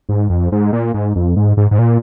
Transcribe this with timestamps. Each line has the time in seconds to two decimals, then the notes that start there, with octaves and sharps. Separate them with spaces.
0.09 G#2
0.30 F2
0.52 G#2
0.73 A#2
0.94 G#2
1.16 F2
1.36 G#2
1.57 G#2
1.71 G#2
1.79 A#2